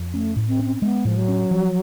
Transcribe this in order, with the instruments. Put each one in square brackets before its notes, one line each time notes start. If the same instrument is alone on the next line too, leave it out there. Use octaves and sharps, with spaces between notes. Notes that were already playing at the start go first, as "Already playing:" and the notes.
Already playing: [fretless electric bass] F2
[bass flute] A3 [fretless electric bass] C#4
[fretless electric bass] A2
[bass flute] C4
[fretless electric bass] C#4
[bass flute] C4
C4
[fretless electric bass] G#3 [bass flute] B3
[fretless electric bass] A2 [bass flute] F3
[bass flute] F#3
[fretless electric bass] C#4
F3